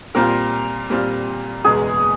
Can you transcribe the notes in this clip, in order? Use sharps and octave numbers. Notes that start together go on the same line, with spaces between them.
A#2 G3 C4 F4 A#4
A#2 G3 C4 F4
F#1 E2 B2 G#3 B3 G#4